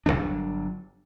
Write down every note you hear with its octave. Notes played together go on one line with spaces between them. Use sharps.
G1 F#2 F#3 D4